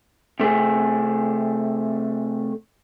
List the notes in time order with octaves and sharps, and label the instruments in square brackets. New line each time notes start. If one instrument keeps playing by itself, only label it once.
[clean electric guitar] C3 A3 C4 G#4